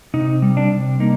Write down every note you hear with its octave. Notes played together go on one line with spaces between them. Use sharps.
C3 D#4
G3
D4
C3
A#3 D#4